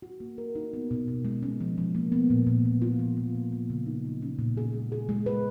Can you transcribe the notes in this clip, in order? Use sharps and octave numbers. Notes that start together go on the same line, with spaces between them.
F#4
A#3
A#4
D#4
B3
B2
B2
G#3
C#4
F3
F3
A#3
B3
A#2
A#2
F3
F4
F3
F3
A#3
A#3
C#3
D#4
F#3
C#4
A#2
G#4
G#3
G#4
G#3
B4